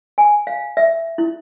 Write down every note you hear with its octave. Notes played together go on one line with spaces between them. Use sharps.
G#5
F5
E5
E4